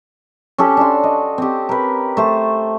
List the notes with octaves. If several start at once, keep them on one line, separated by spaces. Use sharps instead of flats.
C#4 G4 A4
D4 F#4 C6
D#5
C4 G4
A#4 B4
A3 C5 C#6